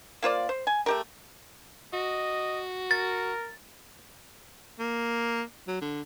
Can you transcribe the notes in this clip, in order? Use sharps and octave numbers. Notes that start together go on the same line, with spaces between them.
A#3 F4 C5 D5
C5
G#5
A3 G4 A#4
F#4 D#5
A#4 A6
A#3
F#3
D3